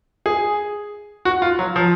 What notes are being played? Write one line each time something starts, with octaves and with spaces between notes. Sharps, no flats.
G#4
F#4
F4
F#3
F3